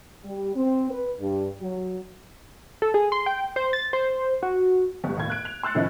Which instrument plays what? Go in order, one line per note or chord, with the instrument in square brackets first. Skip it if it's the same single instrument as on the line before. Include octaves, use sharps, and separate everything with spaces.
[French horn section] G3
C4
B4
G2
F#3
[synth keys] A4
G#4
C6
G5
C5
A6
C5
F#4
[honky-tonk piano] G1 G3
D#2 A2 G#6
F#6 D7
F7
C6 E6 F#6 A6 C#7
A2 D#3 F3 C#4 D#4 E4